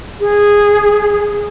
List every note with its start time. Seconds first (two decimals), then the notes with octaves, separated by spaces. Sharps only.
0.20 G#4